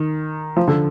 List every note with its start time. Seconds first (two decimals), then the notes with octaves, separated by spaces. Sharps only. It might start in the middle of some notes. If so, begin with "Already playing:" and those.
Already playing: D#3
0.57 F3
0.68 D3